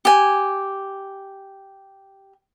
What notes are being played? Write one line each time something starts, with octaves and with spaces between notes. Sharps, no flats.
G4 G#5